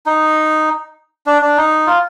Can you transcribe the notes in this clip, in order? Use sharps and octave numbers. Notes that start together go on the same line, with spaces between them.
D#4
D4
D4
D#4
F4